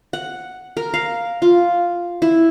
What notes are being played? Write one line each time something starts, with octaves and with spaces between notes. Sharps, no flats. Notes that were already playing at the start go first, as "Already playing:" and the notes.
F#5
A#4
F5
F4
E4